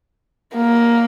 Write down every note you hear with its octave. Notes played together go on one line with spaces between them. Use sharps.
A#3